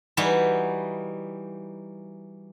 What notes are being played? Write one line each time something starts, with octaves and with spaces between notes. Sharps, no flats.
E3 G3 D#4 F#4